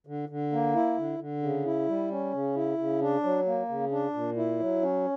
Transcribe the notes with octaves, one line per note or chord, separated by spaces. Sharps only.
D3
D3
A#3
E4
D3
D3
C#3
E4
G3
C#4
C#3
E4
C#3
D4
F#3
A#3
C#3
D4
A#2
E4
F#3
C#4